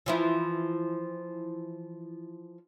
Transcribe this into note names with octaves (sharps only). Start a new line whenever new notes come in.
E3 F3 E4